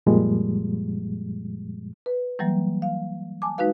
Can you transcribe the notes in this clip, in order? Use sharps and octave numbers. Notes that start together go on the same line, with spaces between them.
F#2 A#2 F3 G3 G#3
B4
E3 F#3 G3 A#3
F5
G#5 A5 D6
G#3 D#4 F#4 B4 F5